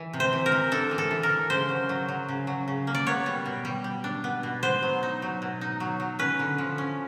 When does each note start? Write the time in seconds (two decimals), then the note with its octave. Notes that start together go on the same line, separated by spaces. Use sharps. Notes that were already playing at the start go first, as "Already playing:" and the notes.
Already playing: E3
0.13 C3
0.20 C5
0.33 E3
0.46 A#4
0.52 E3
0.71 D4 A4
0.91 E3
0.98 A4
1.11 E3
1.23 A#4
1.30 E3
1.50 C#3 C5
1.69 F#3
1.89 F#3
2.08 F#3
2.28 C#3
2.47 F#3
2.68 C#3
2.87 A#3
2.95 D5
3.07 B3 C#5
3.26 G3
3.46 B2
3.65 G3
3.84 G3
4.04 D4
4.24 B3
4.43 B2
4.63 B3 C5
4.83 F#3
5.03 D#4
5.22 F#3
5.42 B2
5.61 D#4
5.80 F#3
6.00 F#3
6.19 C#4 B4
6.39 D3
6.58 F3
6.78 C#4